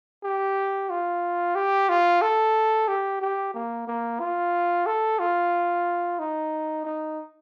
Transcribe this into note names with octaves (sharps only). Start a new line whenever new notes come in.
G4
F4
G4
F4
A4
G4
G4
A#3
A#3
F4
A4
F4
D#4
D#4